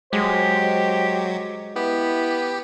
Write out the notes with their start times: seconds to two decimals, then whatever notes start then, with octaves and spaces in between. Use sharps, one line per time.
0.13 F#3 G#3 G4 C5
1.76 B3 E4 G4